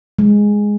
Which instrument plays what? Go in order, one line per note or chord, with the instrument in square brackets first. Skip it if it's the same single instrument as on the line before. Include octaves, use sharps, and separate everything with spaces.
[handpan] G#3